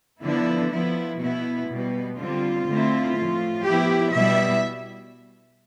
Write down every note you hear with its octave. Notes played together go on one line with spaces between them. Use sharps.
D3 F3 B3 D4 E4
F3 B3 E4
B2 B3 E4
B2 G3 B3
D3 G3 C4 F4
D3 A3 C4 E4
A2 F3 A3
F3 B3 E4 G4
B2 G3 B3 E4 E5